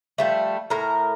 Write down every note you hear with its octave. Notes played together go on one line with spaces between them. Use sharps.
F3 G3 A3
A2 A#4